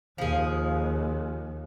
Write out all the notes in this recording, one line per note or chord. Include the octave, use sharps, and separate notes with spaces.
D#2 F3 G#4